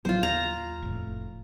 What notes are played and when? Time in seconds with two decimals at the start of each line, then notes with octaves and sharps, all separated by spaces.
0.05 A1 F#3 B3 F4 C5
0.23 D#2 A#5
0.82 F1 A2